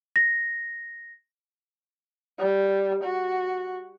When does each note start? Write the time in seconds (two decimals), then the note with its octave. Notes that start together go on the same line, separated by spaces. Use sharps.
0.16 A#6
2.38 G3
3.04 F#4